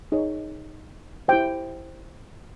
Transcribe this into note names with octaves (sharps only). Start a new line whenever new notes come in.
D#4 G#4 C#5
E4 G4 C5 G5